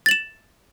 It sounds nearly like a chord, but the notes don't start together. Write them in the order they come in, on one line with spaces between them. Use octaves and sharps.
A6 F#7 E7